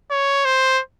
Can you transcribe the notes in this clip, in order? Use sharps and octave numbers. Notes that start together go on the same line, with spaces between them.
C#5
C5